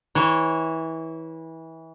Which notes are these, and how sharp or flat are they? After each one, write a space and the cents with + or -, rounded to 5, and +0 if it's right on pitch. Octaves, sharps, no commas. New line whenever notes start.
E3 -25 C#5 -20